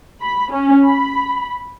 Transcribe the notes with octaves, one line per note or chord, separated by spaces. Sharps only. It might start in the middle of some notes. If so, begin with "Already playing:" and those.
B5
C#4
B5